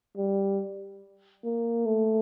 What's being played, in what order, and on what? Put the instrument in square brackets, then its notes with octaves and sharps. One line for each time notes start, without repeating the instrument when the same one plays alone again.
[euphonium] G3
A#3
A3